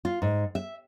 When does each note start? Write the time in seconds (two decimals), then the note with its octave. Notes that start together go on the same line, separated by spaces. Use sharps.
0.05 F4
0.22 G#2
0.55 E5